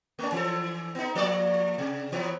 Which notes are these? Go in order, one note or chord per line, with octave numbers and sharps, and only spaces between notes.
A3 C#4
E3 A4
B3 D#4
F3 A#3 D5
C3
E3 F#3 B3